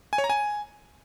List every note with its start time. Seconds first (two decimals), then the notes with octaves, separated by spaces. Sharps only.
0.13 G#5
0.18 C#5
0.24 A#5
0.30 G#5